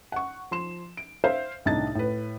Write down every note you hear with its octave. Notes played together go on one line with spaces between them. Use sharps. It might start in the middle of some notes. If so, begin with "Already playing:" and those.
F#5 C#6
F3 C6 E7
D7
C5 E5 F5
C2 A2 D4 D#4 A6
A2 B4